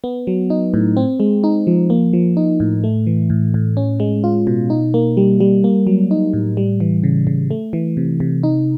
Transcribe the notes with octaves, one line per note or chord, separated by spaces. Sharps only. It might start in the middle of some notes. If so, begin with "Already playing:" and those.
B3
F#3
D#4
A2
C4
G#3
D#4
F3
A#3
F3
D#4
A2
A3
E3
A2
A2
C#4
G#3
F4
B2
D#4
A#3
G3
G3
A#3
F#3
D#4
A2
G3
E3
C#3
C#3
A3
E3
C3
C3
D#4